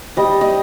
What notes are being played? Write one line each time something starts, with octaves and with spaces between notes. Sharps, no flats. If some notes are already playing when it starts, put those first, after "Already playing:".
G3 D#5
D#5